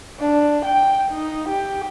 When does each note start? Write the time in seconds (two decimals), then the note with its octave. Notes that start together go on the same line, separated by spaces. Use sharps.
0.19 D4
0.65 G5
1.11 D#4
1.49 G4